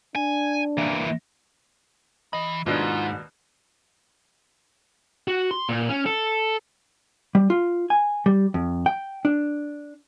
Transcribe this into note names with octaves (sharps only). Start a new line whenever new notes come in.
D4 G#5
E3 A#3
E3 D#5 B5
D#2 G#2 B2 D4 F4
F#4
C6
A#2
C#4
A4
G3
F4
G#5
G3
F2
G5
D4